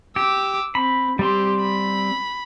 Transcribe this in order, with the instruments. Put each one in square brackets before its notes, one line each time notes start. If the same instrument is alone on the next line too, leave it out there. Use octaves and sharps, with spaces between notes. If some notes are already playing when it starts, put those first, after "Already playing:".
[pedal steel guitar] G4 [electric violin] D6 E6
[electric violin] C4 [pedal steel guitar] B5
[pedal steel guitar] G3 C4 C6 [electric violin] G4
[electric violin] B5